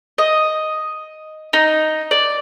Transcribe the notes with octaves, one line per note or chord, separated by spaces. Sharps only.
D#5
D#4
D5